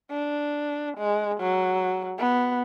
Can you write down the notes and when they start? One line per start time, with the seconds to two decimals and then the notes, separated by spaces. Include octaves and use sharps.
0.11 D4
0.97 G#3
1.40 F#3
2.18 B3